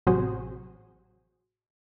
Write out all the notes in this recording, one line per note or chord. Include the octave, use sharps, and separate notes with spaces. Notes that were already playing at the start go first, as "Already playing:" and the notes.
A1 C3 F#3 F#4 G#4 C5